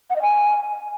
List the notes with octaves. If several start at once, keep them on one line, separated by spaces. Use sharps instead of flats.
F#5
D#5
G#5